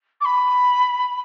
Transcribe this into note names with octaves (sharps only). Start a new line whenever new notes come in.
D6
B5